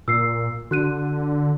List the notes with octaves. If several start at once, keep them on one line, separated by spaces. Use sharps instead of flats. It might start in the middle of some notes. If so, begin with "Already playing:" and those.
A#2 E6 C7
D3 F#4 F#6 D#7